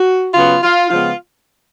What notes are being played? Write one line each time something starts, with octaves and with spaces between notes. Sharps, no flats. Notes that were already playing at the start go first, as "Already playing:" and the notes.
Already playing: F#4
C#3 F#3 B3 F4
F4
C#3 F3 G#3 B3 F4